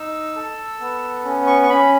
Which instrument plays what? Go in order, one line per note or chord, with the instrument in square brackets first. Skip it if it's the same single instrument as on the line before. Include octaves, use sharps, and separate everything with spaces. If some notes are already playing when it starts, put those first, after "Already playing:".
Already playing: [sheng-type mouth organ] D#4 E6
A4
B3
C#4
C#6
C#6
C#4 B5